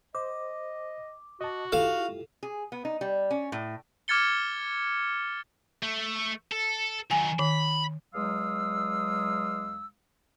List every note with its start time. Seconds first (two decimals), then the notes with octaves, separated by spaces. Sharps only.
0.15 C5 D#5 D6
1.41 F#4 D#5 A5
1.72 E4 F4 G4 A4 F5
2.43 G#4
2.72 B3
2.85 D#4
3.01 G3
3.31 C#4
3.52 A2
4.08 D6 F6 G#6 A6 C#7 G7
5.83 A3
6.52 A4
7.11 D#3 F#3 G#5
7.39 D#3 B5
8.15 E2 F#3 G#3 F5 D#6 E6